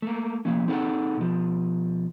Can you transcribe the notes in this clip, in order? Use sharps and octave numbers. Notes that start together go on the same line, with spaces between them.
A3 A#3
F3 A#3 C#4
C4 D#4 G#4 A4 F#5
B2 F3